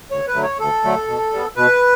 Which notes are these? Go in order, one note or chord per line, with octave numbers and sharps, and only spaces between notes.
D2 C#5
B4
D3 F#3 A3
C#5
D2 A4
D3 F#3 A3
B2
G3 B3
B2 B4